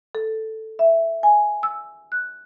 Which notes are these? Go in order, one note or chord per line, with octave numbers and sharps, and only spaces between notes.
A4
E5
G#5
E6
F#6